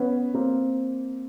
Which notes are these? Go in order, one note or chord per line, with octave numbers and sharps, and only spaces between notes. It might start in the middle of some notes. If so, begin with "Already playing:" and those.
Already playing: B3 C#4
A#3 C4